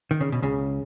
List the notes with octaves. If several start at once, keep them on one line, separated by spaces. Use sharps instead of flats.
D#3
C#3
B2
C#2 C#3